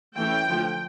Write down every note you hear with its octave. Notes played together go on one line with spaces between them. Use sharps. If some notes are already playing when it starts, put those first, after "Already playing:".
E3 A3 C#4 E4 G5
D3 F3 A3